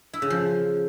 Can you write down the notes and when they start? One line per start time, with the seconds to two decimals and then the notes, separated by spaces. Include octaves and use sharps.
0.13 E4
0.22 C#3
0.30 F3